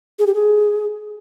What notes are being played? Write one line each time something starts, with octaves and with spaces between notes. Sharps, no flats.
G#4
G4
G#4